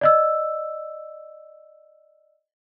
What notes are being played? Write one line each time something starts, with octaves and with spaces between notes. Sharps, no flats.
D5 D#5 E6